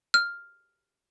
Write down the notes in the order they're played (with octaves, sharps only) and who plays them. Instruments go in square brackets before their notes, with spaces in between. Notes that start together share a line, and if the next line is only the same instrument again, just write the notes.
[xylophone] F6